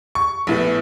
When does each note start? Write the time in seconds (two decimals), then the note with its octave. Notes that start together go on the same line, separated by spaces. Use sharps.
0.15 C#6
0.47 A#1 A2 B3